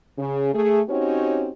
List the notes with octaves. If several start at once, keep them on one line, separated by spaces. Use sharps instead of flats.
C#3
A3 G#4
C4 C#4 D#4 F#4 G4 C#5